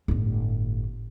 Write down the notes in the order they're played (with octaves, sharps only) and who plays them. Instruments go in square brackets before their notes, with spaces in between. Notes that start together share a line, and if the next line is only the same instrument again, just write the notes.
[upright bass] G1 A2